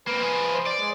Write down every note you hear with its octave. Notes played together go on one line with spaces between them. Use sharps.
A#3 C4 B4
F3 G#4
C5
D5
G#3